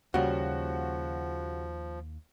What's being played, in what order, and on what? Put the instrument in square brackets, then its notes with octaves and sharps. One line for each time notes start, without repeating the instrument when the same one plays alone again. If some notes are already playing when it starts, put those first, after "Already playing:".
[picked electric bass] D#2 A#3 [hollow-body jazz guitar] C#3 G3 [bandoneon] F3 [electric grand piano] F#4